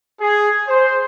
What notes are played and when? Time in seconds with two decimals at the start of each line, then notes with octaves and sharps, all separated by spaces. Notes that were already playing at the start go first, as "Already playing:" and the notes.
0.20 G#4
0.68 C5